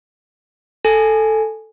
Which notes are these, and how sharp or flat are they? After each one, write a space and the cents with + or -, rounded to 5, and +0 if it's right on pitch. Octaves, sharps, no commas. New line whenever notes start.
A4 +0 G#5 +0